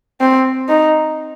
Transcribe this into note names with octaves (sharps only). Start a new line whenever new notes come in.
C4
D#4